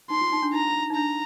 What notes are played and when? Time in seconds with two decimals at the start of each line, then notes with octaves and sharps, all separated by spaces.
0.10 D#4 C6
0.21 F4
0.32 D#4
0.42 D4
0.53 D#4 A#5
0.90 D#4
0.95 D4 A#5